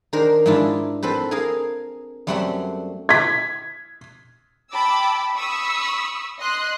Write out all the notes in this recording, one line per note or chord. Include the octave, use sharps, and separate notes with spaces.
D#3 D4 A#4 C5
G#2 G#3 D4 E4 F4
C4 A4 B4 C5
G#4 A#4 F5 G#5
F#2 G3 A3 C4 F#5 C6
G#6 B6
G5 A5 B5 D6 E6
B5 C#6 D#6 E6
D#5 C6 F#6